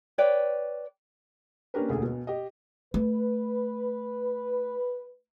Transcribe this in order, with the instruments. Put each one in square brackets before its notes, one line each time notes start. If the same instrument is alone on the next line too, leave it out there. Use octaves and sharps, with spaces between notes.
[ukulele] B4 C#5 D5 G5
[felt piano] A#3 C#4 D4 G4 A#4 B4
E1 D2 G#4 A4
B2
G4 D#5
[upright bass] A3 [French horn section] B4